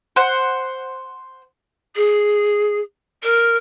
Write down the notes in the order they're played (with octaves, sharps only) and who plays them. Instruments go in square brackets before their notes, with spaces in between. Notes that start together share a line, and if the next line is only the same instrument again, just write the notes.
[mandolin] C5 F#5
[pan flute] G#4
A#4